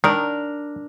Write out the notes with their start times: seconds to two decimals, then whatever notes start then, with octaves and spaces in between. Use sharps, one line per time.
0.04 D#3 D4 A#4